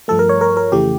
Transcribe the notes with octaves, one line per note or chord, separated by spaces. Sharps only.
G2 F3 A3 A4
A#4
C#5
A#4
A#4
F2 C#3 E3 A3 G4